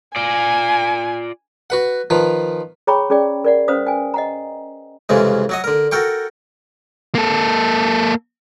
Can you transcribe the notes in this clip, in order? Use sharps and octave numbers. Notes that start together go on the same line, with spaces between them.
F4 D5 G#5
F#4 B4 F#5
D#3 F3 B4
G#4 C#5 G5 A#5 B5 C#6
C#4 G#4 D5 G5
A#4 D5 F#5
C#4 B4 C5 F5 D#6
G5 G#5
D#5 F#5 A#5
C2 F2 C#3 E3 G#3
F#3 F#4 D#5
D3 A#4
F#4 A4 A#4 G5 C#6
A#3 A4